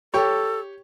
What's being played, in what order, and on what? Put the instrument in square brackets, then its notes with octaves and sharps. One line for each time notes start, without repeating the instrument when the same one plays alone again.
[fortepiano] G4 C#5 [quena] A4